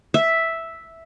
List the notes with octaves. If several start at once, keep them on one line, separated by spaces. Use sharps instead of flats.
E5